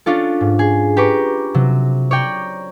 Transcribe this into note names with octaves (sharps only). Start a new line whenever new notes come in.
C#4 D4 F4 A4
G#2
G#4
G4 B4 A#5 C#6 D6
C3 F#3
C#5 D5 G5 A#5